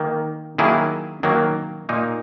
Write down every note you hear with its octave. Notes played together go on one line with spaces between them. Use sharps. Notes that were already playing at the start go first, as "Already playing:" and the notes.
Already playing: D#3 A#3
D#3 F#3 A#3 E4 G#4
D#3 F#3 A#3
A#2 A#3 D#4